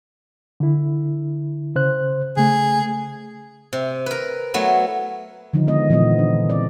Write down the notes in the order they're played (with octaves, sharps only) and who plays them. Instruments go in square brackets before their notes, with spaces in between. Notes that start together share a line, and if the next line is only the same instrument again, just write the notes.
[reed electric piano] D3 E4
C#3 C5 F#6
[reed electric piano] C#3 A3 [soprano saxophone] G#4
[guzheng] C3
A#4 B4
F#3 A3 B3 E4
[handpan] D3 D#3 F3 D#4
G#3 B3 D#5
A#2 E3 F3 B3 D#5
D4
C4 D5